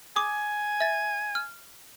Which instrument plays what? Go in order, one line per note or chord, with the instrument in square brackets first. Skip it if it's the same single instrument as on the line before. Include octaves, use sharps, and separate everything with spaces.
[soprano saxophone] G#5 [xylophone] D6 D#6
[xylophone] E5 A6
F6